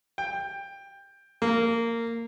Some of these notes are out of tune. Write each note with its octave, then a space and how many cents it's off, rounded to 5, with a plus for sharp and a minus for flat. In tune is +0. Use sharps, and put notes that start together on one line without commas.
G5 +15
A#3 -15